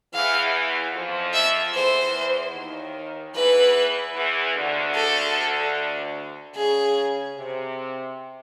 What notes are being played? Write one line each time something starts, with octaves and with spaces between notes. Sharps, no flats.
E2 E3 F5
F2 F3
E5
E2 E3 C5
D#2 D#3
E2 E3 B4
E2 E3
D2 D3
A4
C#3 G#4
C3